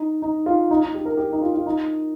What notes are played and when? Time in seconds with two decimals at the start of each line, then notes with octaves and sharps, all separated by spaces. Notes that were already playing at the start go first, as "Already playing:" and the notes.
Already playing: D#4
0.22 D#4
0.46 F4
0.71 D#4
0.83 D#4
0.94 G4
1.05 A#4
1.17 G4
1.32 D#4
1.41 F4
1.55 F4
1.66 D#4